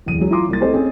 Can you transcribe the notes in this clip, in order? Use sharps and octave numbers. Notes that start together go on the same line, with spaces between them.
D1 E2 D#7
F#3 G#3
E4 F4 A#5 C6 D6
C2 A#3 A6
A3 C4 G4 A4 C5 D#5
C4 C#4 G#4